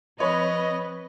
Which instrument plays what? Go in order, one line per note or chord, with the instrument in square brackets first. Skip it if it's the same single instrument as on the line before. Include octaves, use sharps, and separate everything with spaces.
[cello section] F3 C4 B4 [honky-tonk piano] C#5 B5 [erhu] D#5